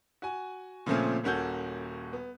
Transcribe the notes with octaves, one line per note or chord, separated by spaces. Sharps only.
F#4 G#5
A#2 C#3 F3 A3 C4 C#4
D#1 A#3 C#4 F#4 A4 G6
B3